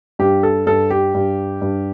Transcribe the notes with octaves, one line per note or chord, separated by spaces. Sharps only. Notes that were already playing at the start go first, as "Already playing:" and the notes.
G2 G4
A4
G2 A4
G4
G2
G2